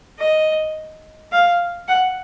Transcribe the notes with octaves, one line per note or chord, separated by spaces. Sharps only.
D#5
F5
F#5